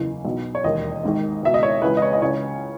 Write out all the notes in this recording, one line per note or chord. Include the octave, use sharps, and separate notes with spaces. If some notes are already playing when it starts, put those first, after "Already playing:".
Already playing: F#1 E2 C#3 E3
B1 B2
C#5
E1 D#2 D#3 D#5
G#1 G#2 D#3
C#2 B2 E5
D#5
C#5
C#2 C#3 E3 B4
D#5
C#5
D#5
C#2 C#3 E3 C#5